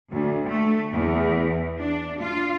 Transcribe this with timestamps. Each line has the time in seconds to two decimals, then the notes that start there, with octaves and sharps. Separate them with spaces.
0.12 D2
0.47 A3
0.93 E2
1.79 D4
2.21 F4